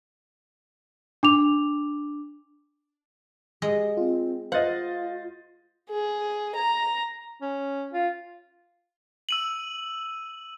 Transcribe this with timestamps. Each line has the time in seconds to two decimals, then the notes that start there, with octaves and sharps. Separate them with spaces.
1.23 D4 D6 F7
3.62 G#3 G4 D#5
3.97 C4 F4
4.52 F4 C5 D#5 F5 F#5 A6
5.90 G#4
6.56 A#5
7.42 C#4
7.94 F4
9.29 E6 D#7 F#7